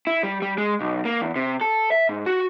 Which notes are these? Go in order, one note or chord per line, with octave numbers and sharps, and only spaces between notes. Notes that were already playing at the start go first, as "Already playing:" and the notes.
E4
G3
G3
G#3
B1
A#3
E2
C3
A4
E5
G#2
F#4